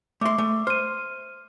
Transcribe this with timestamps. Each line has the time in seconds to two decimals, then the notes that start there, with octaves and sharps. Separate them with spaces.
0.21 A3 E5 C6 D6
0.38 A3
0.67 C5 F6 D#7